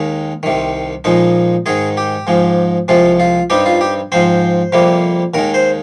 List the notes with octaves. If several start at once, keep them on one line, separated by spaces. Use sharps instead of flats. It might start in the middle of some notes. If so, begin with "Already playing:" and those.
Already playing: D#2 D#3 G#3
C2 C3 D#3
A#2 F3 G#3 D#4
G#2 D#3 G#3 G#4
G4
G#2 F3 G#3
C2 C3 F3 G#3 F4
F4
G2 G3 C4 D#4 G4
F4
G4
G#2 F3 C4 C5
F2 C3 G3 A#3
D#2 D#3 G#3 A#4
C5